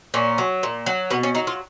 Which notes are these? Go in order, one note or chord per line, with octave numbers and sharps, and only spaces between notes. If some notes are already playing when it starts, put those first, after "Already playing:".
A#2 C#4
F#3
A#2
F#3
B2 B3
C#4
F#3 D#4
F4